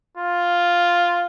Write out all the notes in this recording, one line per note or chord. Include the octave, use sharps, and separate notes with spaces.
F4